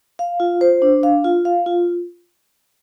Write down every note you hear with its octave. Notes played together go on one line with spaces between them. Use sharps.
F5
F4
C5
D4
F5
F4
F5
F4